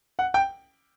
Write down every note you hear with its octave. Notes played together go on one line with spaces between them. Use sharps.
F#5
G5